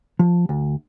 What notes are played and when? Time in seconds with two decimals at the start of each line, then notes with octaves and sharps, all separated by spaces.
0.19 F3
0.49 D2